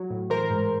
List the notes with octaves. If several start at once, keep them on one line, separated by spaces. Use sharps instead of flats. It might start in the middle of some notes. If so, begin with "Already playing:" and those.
Already playing: F#3
A2
E3 A#4 C5
G#2